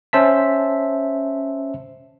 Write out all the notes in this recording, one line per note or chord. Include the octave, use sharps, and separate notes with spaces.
C#4 C5 E5 A5 B6